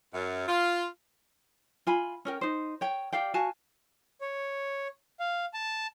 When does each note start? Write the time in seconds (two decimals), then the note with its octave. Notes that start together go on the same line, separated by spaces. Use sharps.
0.13 F#2
0.47 F4
1.87 F4 G#5 B5
2.25 C#4 A#4 G5
2.41 D#4 C5
2.81 C#5 G5
3.13 G4 D5 F5 G5
3.34 F#4 F5 G#5 A5
4.21 C#5
5.20 F5
5.54 A5